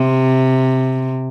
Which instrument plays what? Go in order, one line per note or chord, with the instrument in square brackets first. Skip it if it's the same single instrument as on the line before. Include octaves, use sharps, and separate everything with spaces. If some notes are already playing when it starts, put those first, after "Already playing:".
Already playing: [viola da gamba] C3